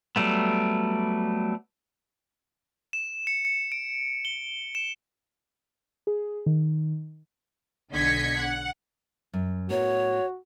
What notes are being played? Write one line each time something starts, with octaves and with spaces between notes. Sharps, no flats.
F#3 G3 A3 B3
E7
C#7
C#7
D7
G7
E7
G#4
D#3
B1 D3 D#5 G#6 B6 C#7
F#5
F#2
A2 B3 F#4 A#4 C#5